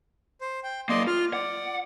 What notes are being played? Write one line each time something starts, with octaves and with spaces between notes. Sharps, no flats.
C5
G5
F#3 A#3 D5 D#5 C6
F4 F6
D5 F#5